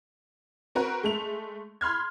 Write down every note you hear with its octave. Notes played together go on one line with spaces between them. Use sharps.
C4 F#4 A#4 B4
G#3 A3 F7
B5 C6 F6 G#6